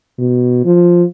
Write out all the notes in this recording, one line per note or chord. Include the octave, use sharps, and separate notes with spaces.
B2
F3